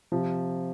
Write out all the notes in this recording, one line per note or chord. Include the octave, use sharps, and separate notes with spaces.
C3 F3